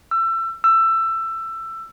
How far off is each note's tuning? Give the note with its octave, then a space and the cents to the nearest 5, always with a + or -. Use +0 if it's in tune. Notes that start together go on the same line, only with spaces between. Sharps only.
E6 +30
E6 +20